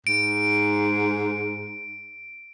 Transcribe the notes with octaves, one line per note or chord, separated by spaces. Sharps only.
G#2 D7